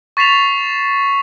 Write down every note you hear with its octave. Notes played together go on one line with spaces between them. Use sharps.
C#6 A6 B6 C7 E7 F7